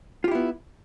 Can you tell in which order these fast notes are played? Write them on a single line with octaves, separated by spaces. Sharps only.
F4 G4 E4 B3